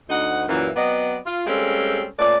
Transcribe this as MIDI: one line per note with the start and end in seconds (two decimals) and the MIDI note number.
0.09 0.44 38
0.09 0.44 63
0.09 0.44 78
0.48 0.70 42
0.48 0.70 46
0.48 0.70 52
0.76 1.18 54
0.76 1.18 59
0.76 1.18 60
0.76 1.18 74
0.76 1.18 75
1.25 1.44 65
1.47 2.07 55
1.47 2.07 56
1.47 2.07 58
1.47 2.07 60
1.47 2.07 61
1.47 2.07 69
2.19 2.36 46
2.19 2.36 57
2.19 2.36 61
2.19 2.36 71
2.19 2.36 74